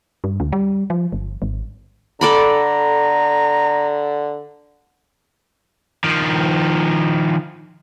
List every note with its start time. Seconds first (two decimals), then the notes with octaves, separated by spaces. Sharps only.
0.24 G2
0.40 D2
0.52 G3
0.90 F3
1.12 G1
1.42 G#1
2.21 D3 A4 D5 A#5 B5
6.04 D#3 F3